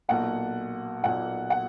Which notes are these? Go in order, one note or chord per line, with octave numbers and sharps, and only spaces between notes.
B1 A#2 A#3 F#5
B1 A#2 A#3 F#5
F#5